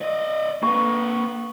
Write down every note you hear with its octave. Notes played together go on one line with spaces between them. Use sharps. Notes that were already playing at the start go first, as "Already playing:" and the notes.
D5 D#5
A#3 B4 C#6